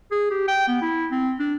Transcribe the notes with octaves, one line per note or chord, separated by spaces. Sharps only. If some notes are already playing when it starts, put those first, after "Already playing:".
G#4
G4
G5
B3
E4
C4
D4